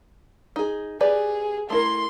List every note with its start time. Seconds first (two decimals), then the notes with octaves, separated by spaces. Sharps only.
0.56 D#4 G#4
1.01 G4 G#4 B4 D5
1.70 A3 E4 A#4 C6